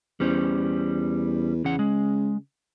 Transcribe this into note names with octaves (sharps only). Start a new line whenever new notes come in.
E2 G3 C#4 C5
E2 C#3 E3 F#5
G#3